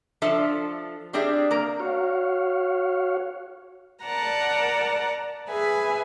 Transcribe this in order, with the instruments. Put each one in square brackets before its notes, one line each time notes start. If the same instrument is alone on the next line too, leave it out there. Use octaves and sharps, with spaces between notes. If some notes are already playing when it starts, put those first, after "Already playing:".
[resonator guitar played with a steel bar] F3 D4 F4 A4 E5
G3 C4 D4 G4 G#4 E5
A#3 A#4
[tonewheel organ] F#4 C#5 F5
[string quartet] A#4 D5 F#5 A5 A#5
G#4 B4 E5 G#5 B5